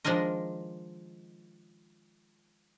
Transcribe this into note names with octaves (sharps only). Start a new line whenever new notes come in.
D#3 F3 G#3 D4 A#4 D#5